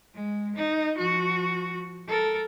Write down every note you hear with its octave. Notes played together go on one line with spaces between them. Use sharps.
G#3
D#4
F3 F#4
A4 A#4